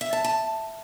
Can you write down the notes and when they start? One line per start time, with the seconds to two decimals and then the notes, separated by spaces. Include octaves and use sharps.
0.01 E5
0.13 A5
0.24 A5